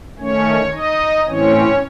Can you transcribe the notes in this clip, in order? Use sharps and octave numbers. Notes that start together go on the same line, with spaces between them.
D#3 A3 C#4 C#5
D#4 D#5
A2 E3 C4 C#4 C#5